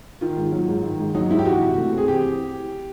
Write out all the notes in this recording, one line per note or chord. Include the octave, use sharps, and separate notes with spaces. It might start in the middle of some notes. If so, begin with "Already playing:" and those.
D#3 F4
G#2
F#3
G#2
D#3
G#2
F#3 D#4
G#2 E4
G4
E3 F#4
C3
A3
C4 G#4
E3 G4